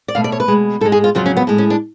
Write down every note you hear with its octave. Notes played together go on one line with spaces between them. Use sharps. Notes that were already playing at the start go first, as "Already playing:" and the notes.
D5
B2 A3 F5
D5
C#5
B4
B2 G#3
G#2 G#3 A4
G#4
F4
F2 C#3 F#3 F4
C#4
B3
A2 G#3
C#4
D4